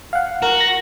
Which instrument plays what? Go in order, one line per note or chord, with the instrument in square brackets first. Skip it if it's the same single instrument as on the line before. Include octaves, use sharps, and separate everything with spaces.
[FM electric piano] F5 F#5
[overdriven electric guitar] F#4 [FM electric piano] A#4
[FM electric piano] A#6